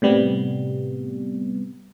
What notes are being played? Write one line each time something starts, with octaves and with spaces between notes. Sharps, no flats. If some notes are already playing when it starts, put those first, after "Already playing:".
A2 C3 G3 B3